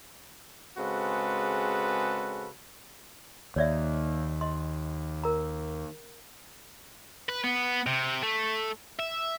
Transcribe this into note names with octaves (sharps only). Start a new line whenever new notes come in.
C#3 G#3 C4 F#4 A4 B4
D#2 C#5 D5 E5
D#5 C6
A#4 A#5
B4
B3
C3
A3
E5